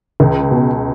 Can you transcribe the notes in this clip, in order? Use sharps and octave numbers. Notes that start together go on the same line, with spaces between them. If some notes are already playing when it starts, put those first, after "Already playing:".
C#2
B2